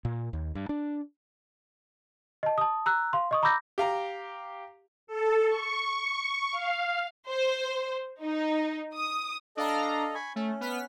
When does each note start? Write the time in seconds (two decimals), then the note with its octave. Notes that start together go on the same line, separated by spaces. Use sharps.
0.05 A#2
0.33 D#2
0.55 G2
0.69 D4
2.43 D#5 A5
2.58 A5 D#6
2.86 A#5 E6 F#6
3.13 F5 C6
3.31 D#5 C#6 D#6
3.43 A#5 B5 D6 E6 G6 A#6
3.78 G4 F5 A#5
5.07 A4
5.47 C#6
6.51 F5
7.28 C5
8.22 D#4
8.94 D#6
9.57 D4 A4 D#5 F5 A#5
10.15 G#5 B5 C#6
10.36 A3 C#4
10.61 B3 F6 B6